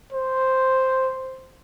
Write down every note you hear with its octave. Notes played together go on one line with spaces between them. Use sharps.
C5